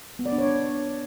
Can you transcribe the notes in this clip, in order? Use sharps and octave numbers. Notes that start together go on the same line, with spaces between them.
B3
D5
D4
C#5